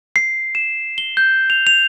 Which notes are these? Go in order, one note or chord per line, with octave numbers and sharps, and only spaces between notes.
C7
E7
G7
G6
F7
F7